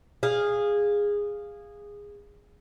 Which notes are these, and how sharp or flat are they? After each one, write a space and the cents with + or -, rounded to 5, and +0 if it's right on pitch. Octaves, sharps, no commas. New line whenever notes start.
G#4 -15 F5 +0